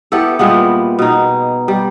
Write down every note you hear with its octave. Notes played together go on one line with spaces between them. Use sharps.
B3 E4 G4 A4
A#2 G3 G#3 B3
B2 D#4
G3